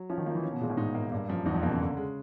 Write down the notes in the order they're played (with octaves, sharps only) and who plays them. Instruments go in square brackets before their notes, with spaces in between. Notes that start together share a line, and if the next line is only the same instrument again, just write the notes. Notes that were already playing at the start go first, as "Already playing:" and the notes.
Already playing: [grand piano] F#3
[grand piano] F3 [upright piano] C#4
[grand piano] D#3
[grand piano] F3 [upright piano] A#3
[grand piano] E3
[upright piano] C#4
[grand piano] B2
[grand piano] A#2 [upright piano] G#3
[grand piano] A2
[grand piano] G#2 [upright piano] D#4
[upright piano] A#3
[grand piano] G2 [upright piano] A#3
[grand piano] F#2 [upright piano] F3
[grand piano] E2 [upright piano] D#4
[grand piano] F2
[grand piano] B2 [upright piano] A#3
[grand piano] C#3
[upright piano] D3
G#3